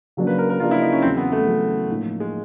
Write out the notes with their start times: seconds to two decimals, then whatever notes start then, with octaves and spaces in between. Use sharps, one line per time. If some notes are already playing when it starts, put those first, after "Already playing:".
0.17 C#3 F#3 A#3 D4
0.27 B4
0.38 A#4
0.50 A#4
0.60 C#3 F#3 A#3 D4 F4
0.71 E4
0.81 D#4
0.92 C#4
1.02 E2 C#3 F#3 C4
1.17 B3
1.32 A3
1.46 E2 C#3 F#3
1.89 A2 F3 A#3 D#4
2.20 G#3